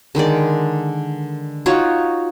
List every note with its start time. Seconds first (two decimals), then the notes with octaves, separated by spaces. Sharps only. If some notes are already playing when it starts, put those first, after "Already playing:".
0.15 D3 D#3 G#3 D5
1.66 D#4 F4 F#4 C#5